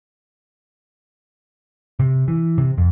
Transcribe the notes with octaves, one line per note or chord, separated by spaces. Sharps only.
C3
E3
C3
F2